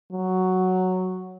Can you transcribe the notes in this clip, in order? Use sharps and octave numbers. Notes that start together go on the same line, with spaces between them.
F#3